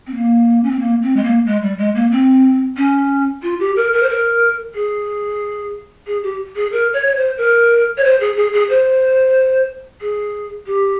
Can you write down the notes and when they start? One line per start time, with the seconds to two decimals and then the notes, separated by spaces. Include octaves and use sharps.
0.07 C4
0.14 A#3
0.64 C#4
0.71 C4
0.79 A#3
1.02 C4
1.16 G#3
1.24 A#3
1.46 G#3
1.62 G3
1.78 G#3
1.95 A#3
2.11 C4
2.77 C#4
3.43 F4
3.60 G4
3.76 A#4
3.93 A#4
4.03 C5
4.09 A#4
4.75 G#4
6.07 G#4
6.23 G4
6.56 G#4
6.72 A#4
6.93 C#5
7.07 C#5
7.16 C5
7.38 A#4
7.98 C#5
8.04 C5
8.20 G#4
8.36 G#4
8.53 G#4
8.70 C5
10.01 G#4
10.67 G4